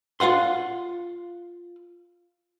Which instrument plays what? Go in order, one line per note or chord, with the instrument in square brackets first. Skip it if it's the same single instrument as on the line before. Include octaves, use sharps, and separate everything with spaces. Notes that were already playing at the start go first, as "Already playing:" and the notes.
[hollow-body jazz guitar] F4 F5 F#5 C6